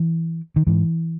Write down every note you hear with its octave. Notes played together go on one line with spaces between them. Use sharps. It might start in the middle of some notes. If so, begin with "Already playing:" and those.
Already playing: E3
D#3
G#2 E3